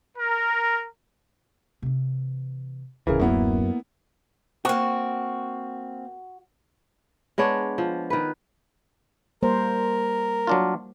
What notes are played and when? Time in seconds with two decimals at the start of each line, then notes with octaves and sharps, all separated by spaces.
0.18 A#4
1.82 C3 E3
3.07 D1 A1 C#3 E3 G#4 A#4
3.20 F#2 A#3 B3 E4
4.65 A#3 C4 F#4
7.38 G#3 B3 D4 C#5
7.78 F3
8.10 D#3 B4
9.43 G3 A#3 A#4 C5
10.47 F#3 D4 F4